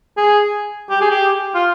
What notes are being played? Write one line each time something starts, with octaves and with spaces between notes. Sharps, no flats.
G#4
G4
G#4
G4
F4